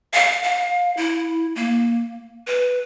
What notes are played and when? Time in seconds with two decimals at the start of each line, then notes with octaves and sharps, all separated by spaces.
0.14 F5
0.43 F5
0.97 E4
1.56 A#3
2.47 B4